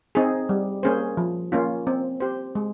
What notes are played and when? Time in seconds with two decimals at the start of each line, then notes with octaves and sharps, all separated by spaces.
0.15 C4 D#4 G#4
0.49 G3
0.83 A#3 C#4 G#4 C5
1.17 F3
1.52 A#3 C#4 F4
1.87 C4
2.20 G4 C5
2.55 G#3